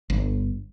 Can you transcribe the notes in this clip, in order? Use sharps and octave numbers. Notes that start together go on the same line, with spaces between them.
G1